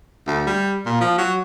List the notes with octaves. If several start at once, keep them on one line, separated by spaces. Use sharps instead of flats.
D2
G3
A#2
F3
F#3